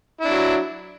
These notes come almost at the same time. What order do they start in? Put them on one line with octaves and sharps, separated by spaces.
E4 D4 F#3